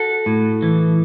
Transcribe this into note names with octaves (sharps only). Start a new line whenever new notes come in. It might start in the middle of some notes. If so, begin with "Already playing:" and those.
Already playing: F#4 A4
A2
E3